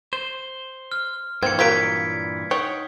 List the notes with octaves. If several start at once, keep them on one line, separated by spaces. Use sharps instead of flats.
C5
F6
G2 A#2 E3 C4 G#6 C#7
F#3 A#3 F4 G#6 B6 D7
D#4 C#5 F#5 G5